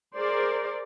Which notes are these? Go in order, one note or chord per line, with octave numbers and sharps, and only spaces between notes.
G#4 A#4 C5 D5